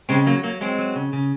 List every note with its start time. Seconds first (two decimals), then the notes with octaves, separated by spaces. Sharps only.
0.09 C#3 G#3 C4
0.27 F#3 A#3
0.43 F#3 A#3
0.61 F#3 G#3 C4
0.78 F#3
0.96 C#3
1.13 C#3